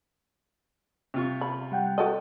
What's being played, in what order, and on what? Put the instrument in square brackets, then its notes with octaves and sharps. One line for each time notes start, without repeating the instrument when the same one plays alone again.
[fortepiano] C3 F4 C#6
[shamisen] B5
[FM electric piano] G3 F#5 G5
[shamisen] F#4 A4 D#5